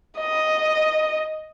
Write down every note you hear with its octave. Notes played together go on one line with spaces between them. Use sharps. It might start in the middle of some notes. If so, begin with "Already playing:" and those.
D#5